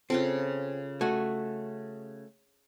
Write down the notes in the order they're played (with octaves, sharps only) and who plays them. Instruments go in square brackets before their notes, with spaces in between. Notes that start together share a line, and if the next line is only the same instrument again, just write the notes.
[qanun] C#3 F4 A4 [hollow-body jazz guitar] C4
[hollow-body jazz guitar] A3 F#4 [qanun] G#5